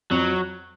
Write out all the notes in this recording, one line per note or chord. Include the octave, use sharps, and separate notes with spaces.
F2 F#3